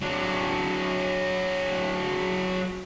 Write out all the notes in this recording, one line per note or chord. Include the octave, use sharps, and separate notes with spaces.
F#3 D4